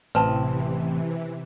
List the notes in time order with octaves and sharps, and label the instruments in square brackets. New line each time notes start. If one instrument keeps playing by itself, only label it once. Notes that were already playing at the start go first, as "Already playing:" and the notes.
[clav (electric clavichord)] A1 C4 [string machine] C3 E3 [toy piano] B4 A5